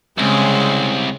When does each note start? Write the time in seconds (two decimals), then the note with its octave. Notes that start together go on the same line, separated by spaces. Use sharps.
0.18 C2 C#3 G#3 C4